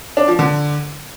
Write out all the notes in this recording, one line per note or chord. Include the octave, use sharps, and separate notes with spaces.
D4
F3
D3